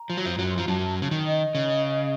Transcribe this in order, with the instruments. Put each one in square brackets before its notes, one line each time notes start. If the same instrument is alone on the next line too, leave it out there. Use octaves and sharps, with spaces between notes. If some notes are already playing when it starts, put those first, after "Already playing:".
Already playing: [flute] A#5
[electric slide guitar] F3
F#3
F2 F3
F#2 F#3
[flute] C6
[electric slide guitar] F3 [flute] A#5
[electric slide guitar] F#2 F#3 [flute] A5
[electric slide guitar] C#3
D#3
[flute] D#5
[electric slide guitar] C#3